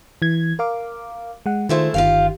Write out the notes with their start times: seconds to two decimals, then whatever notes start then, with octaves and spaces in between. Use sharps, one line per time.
0.22 E3 G#6
0.59 A#4 F5 D6
1.46 G#3 F#5
1.69 D#3 G#3 A3 E4 F4 C5
1.94 G1 D#3 F4 G4 F5